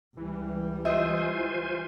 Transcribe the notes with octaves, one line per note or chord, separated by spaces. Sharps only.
C#2 E3 G3
F4 C5 D#5 E5 G#5